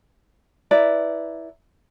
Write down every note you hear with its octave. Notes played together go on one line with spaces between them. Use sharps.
E4 B4 D5 A#5